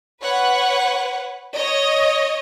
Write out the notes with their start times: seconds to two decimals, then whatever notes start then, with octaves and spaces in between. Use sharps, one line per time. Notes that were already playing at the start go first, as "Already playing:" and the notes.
0.22 B4 C#5 F#5
1.55 C#5 D#5